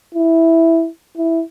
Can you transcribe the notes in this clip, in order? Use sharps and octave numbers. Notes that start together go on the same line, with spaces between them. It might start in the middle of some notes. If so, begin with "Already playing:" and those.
E4
E4